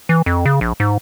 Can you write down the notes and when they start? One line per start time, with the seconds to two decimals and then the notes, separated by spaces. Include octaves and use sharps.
0.09 E3
0.26 F2
0.46 C#3
0.61 A#1
0.80 G#2